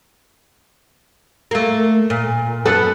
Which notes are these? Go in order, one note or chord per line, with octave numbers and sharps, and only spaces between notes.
A3 A#3
A#2
F#2 B3 A4